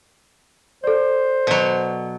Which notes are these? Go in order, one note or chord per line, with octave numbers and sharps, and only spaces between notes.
A4 C5 D5
B2 F#3